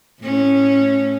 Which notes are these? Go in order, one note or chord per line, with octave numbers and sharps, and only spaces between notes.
A2 C#4